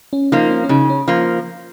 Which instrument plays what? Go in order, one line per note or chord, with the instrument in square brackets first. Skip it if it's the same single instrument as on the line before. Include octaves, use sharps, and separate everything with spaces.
[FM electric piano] C#4
[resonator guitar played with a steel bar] F3 A#3 [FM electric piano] D#4
[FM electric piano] C#4
C#4
[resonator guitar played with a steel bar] C#3 [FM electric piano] D#4
[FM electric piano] C#4
[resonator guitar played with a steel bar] F3 A#3